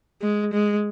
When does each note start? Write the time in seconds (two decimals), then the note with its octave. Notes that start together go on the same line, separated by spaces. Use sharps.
0.21 G#3
0.53 G#3